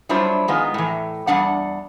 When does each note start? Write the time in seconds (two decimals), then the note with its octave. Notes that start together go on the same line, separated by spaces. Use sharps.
0.09 F#3 G3 D4 E4 F4 C5
0.48 D#3 G#3 B3 D#4 F4
0.74 A2 E3
1.27 E2 G3 D4 F#5